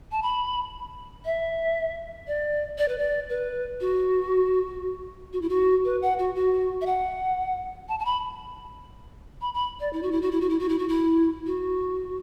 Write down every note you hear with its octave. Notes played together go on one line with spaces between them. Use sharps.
A5
B5
E5
D5
D5
B4
D5
B4
F#4
F#4
E4
F#4
B4
F#5
F#4
F#4
E5
F#5
A5
A5
B5
B5
B5
D5
E4
F#4
E4
F#4
E4
F#4
E4
F#4
E4
F#4
E4
F#4